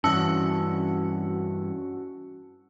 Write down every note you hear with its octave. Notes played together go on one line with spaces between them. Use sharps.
G2 E3 C#4 F#4 A5 E6 C#7